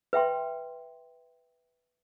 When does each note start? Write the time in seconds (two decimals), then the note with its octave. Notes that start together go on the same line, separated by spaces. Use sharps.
0.13 B4 E5 G5 C6